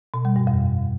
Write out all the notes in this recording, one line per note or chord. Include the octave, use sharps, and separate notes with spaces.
B2
G3
G2
F2